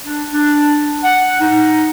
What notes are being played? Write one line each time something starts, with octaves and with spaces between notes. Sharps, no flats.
D4
D4
F#5
D#4